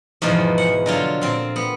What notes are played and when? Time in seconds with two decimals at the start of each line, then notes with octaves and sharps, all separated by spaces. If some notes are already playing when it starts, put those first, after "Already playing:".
0.22 E2 G#2 B2 F3
0.58 F#5
0.86 D3 F#3 F4
1.21 A#2 C4
1.56 B3